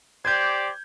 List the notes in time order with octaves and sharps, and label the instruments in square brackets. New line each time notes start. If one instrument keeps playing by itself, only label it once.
[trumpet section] G4 C5 D5 [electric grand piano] G6 G#6